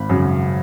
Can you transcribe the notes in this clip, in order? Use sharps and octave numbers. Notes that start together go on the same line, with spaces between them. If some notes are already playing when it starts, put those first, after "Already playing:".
Already playing: G#1 B5
F#2 C#3